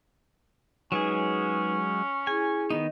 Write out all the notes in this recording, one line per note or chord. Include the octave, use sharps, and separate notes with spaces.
F#3 G#3 C#4 D#4 G#4 B4
E4 G#4 G#5
D#3 B3 D#4 D#5